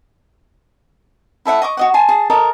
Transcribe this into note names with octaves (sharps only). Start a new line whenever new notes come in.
E4 A4 E5 F#5
D#5 C#6 D6
F#4 D#5 F#5
G#5 A5 C6
G#4 A5
A4 A#4 D#5 A5